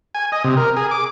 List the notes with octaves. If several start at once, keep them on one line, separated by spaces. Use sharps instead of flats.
G#5
D#5
C3
A#4
G#4
D6